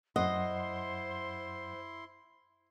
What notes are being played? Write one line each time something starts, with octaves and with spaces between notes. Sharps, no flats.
F#2 E4 C5 D#5 F#5 C6